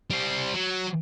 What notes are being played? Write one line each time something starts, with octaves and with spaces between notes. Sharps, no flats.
G3 C5
F#3